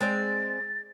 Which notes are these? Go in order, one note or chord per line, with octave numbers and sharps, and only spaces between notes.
G#3 C4 D5 A6